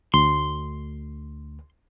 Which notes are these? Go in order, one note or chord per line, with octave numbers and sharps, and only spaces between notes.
D2 C6